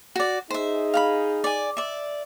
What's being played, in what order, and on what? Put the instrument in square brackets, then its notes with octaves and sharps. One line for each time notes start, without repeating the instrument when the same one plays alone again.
[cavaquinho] F#4 D5
[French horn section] D#4 G#4 [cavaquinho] C5 E5
[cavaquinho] F5 F#5 B5
D5 G#5
D5 E5